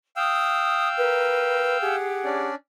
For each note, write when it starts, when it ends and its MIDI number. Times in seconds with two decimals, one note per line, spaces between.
0.16 1.96 77
0.16 1.96 79
0.16 0.89 87
0.16 1.96 88
0.98 1.81 70
0.98 1.81 71
1.81 2.48 67
1.81 2.48 68
1.81 2.48 78
2.25 2.55 61
2.25 2.55 62
2.25 2.55 74